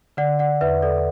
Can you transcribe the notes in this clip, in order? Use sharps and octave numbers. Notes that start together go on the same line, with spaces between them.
D3 D5 F#5
D5 F#5
E2 B4 E5
A4 D5